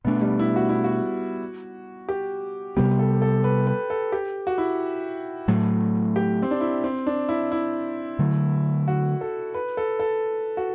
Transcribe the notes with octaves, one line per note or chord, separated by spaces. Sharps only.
B2 A3 B3 D4
G3
E4
F#4
E4
F#4
G4
C3 G3 B3 G4
A4
A4
B4
B4
A4
G4
F#4
E4
A2 F#3 A3
G4
C4
D4
E4
C4
D4
E4
E4
D3 F#3 A3
F#4
A4
B4
A4
A4
F#4